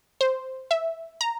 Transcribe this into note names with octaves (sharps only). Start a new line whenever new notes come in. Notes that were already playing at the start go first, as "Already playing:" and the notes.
C5
E5
A#5